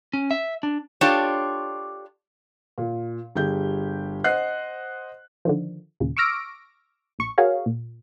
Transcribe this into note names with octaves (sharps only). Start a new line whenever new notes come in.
C#4
E5
D4
D4 F4 G4 A4 C#5
A#2
G1 G4 G#4 G6
C5 D#5 F#5 F#6 C7
D3 D#3 F3
D#2 A#2 C#3
C#6 D6 E6 F6 A#6 D7
A#1 C#6
F#4 G#4 A#4 C#5 F5
A#2